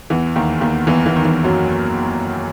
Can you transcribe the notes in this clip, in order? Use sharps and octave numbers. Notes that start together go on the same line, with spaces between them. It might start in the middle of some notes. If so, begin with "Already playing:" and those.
E2 E3
D#2 D#3
D#2 D#3
E2 E3
E2 E3
D#3
E2 E3
F#2 F#3